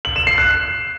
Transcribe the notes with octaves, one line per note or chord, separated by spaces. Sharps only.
F#7
E7
C7
F#6